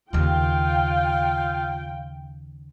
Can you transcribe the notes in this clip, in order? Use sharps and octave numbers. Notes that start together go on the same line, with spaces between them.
D#2 C#3 F4 F5 G5